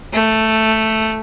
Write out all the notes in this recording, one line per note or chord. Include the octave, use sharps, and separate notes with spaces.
A3